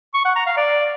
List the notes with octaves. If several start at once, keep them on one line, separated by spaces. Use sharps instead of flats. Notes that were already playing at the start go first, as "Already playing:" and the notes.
C#6
F#5
A#5
F5
D5